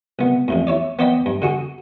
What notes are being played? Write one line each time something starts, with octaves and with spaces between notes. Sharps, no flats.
C2 B3
A1 F2 A2
E4 C#5 D5
B3 C5 D5 D#5 G5 B5
G2
D3 F#4 G#4